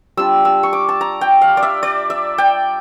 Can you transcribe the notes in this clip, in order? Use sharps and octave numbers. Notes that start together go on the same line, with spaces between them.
G3 D4 F4 E6
E6
C#6
D6
A5
A#5
G5
F5
D5
E5
D5
E5
G5